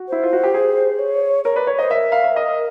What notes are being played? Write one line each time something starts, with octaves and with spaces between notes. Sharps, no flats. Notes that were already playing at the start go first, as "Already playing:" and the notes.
Already playing: F#4
E4 C5
F4
F#4
G4
G#4
C#5
A#4 C#5
B4 D5
C#5
C5 D#5
A#4 E5
F5
E5
D#5